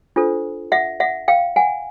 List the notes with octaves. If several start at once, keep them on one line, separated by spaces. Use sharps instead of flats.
D4 F4 A4 C5
E5 F#5
E5 F#5
F5 G5
F#5 G#5